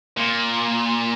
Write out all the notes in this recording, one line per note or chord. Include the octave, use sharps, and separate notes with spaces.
A#2